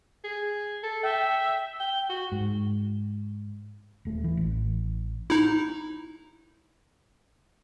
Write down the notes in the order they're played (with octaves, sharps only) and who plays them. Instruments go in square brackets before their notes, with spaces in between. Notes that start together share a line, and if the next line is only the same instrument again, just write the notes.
[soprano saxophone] G#4
A4
[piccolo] E5 [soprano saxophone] G5
[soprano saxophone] G5 [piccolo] G7
[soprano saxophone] F#4
[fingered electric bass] G#2
D#1 A3
E3
A1
[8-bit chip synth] D#4 E4